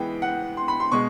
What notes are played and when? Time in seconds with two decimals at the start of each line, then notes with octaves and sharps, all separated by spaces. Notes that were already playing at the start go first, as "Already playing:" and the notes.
Already playing: E3 G#3 B3 G5
0.22 F#5
0.57 C6
0.68 B5
0.80 C6
0.92 B2 G#3 C#6